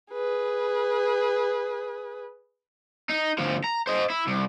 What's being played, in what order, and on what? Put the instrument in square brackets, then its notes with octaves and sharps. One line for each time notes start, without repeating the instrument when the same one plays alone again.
[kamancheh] G#4 B4
[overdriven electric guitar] D#4
D2 F3
A#5
C5 D#5
E4
C2